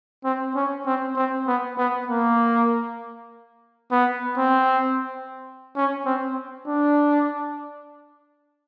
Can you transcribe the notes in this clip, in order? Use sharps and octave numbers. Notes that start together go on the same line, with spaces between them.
C4
C#4
C4
C4
B3
B3
A#3
B3
C4
C#4
C4
D4